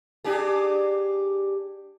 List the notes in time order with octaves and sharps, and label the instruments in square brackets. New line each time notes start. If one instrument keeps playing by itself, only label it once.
[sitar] D4 G4 G#4